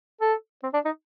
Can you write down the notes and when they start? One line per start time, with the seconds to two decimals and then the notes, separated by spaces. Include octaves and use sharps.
0.21 A4
0.63 C4
0.73 D4
0.85 D#4